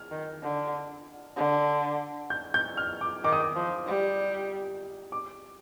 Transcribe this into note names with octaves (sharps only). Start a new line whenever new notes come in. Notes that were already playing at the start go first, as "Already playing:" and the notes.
Already playing: F6
D#3
D3
D3
G6
G6
F6
D6
D#3 D6
D#6
D6
F3
G3
D6